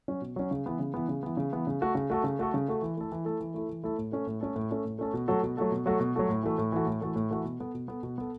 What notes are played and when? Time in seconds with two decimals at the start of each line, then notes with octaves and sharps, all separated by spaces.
0.08 F#3 C#4
0.21 B2
0.36 F#3 C#4
0.51 C#3
0.66 E3 B3
0.79 C#3
0.94 E3 B3
1.09 C#3
1.23 E3 B3
1.37 C#3
1.52 E3 B3
1.67 C#3
1.81 A3 F#4 A4
1.95 C#3
2.10 A3 F#4 A4
2.24 C#3
2.39 A3 F#4 A4
2.54 C#3
2.68 A3 F#4 A4
2.82 E3
2.97 A3 E4 A4
3.12 E3
3.25 A3 E4 A4
3.41 E3
3.54 A3 E4 A4
3.69 E3
3.84 A3 E4 A4
3.98 A2
4.12 A3 C#4 A4
4.27 A2
4.41 A3 C#4 A4
4.56 A2
4.71 A3 C#4 A4
4.85 A2
4.99 A3 C#4 A4
5.14 B2
5.28 F#3 A3 F#4 A4
5.43 B2
5.57 F#3 A3 F#4 A4
5.71 B2
5.86 F#3 A3 F#4 A4
6.00 B2
6.15 F#3 A3 F#4 A4
6.29 A2
6.43 E3 A3 F#4 A4
6.58 A2
6.72 E3 A3 F#4 A4
6.87 A2
7.01 E3 A3 F#4 A4
7.16 A2
7.31 E3 A3 F#4 A4
7.44 B2
7.60 B3 A4
7.74 B2
7.88 B3 A4
8.03 B2
8.18 B3 A4